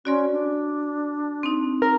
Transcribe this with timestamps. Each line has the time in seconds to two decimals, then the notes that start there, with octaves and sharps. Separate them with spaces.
0.05 C#4 F#4 D5 C6
0.32 D4
1.43 C4 D#4
1.82 A#4